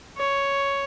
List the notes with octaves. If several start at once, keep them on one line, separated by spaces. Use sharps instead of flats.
C#5